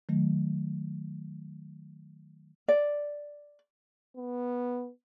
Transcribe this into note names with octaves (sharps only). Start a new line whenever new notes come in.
D#3 F#3 A3
D5
B3